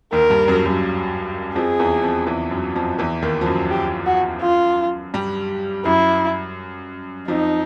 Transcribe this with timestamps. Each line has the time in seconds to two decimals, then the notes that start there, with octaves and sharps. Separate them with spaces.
0.12 D#2 D#3 A#4
0.30 G2 G3
0.48 F#2 F#3
0.66 F#2 F#3
1.56 F2 F3 G#4
1.79 E2 E3
2.03 F2 F3
2.27 E2 E3
2.51 F#2 F#3
2.75 F2 F3
2.99 E2 E3
3.22 D#2 D#3
3.41 F3
3.46 F#2 F#3
3.71 G4
4.07 F#4
4.42 F4
5.14 G2 G3
5.85 F#2 F#3 E4
7.28 F2 F3 D#4